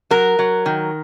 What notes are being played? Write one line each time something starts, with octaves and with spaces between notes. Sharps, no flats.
F#3 A#4
F#3
D#3